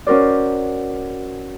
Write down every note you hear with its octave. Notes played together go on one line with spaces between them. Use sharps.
C#4 F#4 A#4 C5 D5